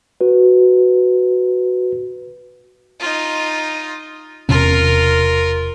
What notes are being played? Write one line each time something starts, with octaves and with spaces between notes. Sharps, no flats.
F#4 B4
D#4 F4
E1 C3 C#4 F4 A#4